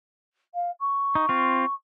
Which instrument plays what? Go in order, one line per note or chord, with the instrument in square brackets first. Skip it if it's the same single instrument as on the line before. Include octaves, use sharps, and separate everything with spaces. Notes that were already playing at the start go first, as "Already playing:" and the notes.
[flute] F5
C#6
[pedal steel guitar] D#4
C4 F4